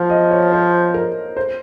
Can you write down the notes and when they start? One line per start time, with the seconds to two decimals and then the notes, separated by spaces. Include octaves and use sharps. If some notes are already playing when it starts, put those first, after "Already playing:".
Already playing: F3 F5
0.10 D#5
0.31 C#5
0.52 C5
0.94 A#4
1.37 C5